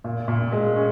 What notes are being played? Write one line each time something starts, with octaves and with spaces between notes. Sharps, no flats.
A#2
A#2
G#3
C#4